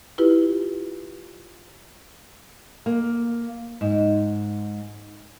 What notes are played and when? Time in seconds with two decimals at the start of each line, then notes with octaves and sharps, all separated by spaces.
0.18 E4 F4 G4 B4
2.86 A#3
3.81 G#2